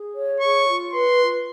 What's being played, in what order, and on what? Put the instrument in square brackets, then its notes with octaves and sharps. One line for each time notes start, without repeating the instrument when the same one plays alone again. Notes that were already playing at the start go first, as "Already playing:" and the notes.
Already playing: [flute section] G#4
C#5
[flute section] G#4 [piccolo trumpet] C#6
[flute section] F4
[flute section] B4 [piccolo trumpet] C6
[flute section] F4